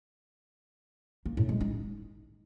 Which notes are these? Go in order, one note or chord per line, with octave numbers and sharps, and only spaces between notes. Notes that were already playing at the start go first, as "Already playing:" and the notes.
A#3
A2
G#3
D#4